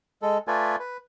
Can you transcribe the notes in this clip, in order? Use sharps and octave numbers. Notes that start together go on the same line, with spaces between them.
G#3 A4
A3 F4 A4 B4 D5 G#5
B4